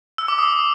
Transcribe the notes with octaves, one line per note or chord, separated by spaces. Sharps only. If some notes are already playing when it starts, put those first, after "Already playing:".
E6
D6
D#6